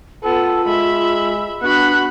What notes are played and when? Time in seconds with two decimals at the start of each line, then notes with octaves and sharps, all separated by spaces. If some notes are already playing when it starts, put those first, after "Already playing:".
0.24 B3 F4 A4
0.66 G#3 E5 B5
1.62 B3 D4 F#4 B5 F#6